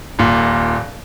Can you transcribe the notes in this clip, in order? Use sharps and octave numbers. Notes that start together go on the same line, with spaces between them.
D#1 A#2